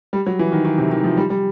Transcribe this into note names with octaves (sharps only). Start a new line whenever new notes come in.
G3
F#3
E3
D#3
D#3
C3
D#3
F3
G3
G3